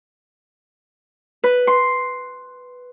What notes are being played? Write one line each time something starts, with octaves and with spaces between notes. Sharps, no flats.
B4
C6